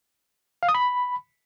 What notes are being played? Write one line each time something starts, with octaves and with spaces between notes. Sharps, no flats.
F5
D#6
B5